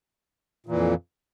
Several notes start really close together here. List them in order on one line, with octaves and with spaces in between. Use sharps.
A#2 E3 F2